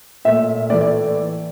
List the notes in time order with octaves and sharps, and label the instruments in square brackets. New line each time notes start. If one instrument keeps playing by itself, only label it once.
[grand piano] A#2 A3 E5
A2 E3 A3 D5
D5